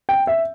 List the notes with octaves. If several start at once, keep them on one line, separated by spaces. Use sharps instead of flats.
G5
E5